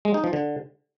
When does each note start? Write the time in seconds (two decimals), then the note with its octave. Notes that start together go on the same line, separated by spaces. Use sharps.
0.05 G#3
0.14 D#4
0.24 F3
0.33 D3